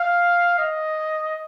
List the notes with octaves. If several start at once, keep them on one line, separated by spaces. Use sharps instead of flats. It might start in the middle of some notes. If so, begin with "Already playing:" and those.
Already playing: F5
D#5